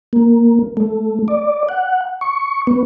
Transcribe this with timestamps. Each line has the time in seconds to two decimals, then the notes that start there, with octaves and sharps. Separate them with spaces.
0.13 A#3
0.77 A3
1.28 D5
1.69 F#5
2.21 C#6
2.67 B3